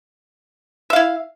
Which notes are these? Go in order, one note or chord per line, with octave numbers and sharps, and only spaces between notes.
E4 E5 F5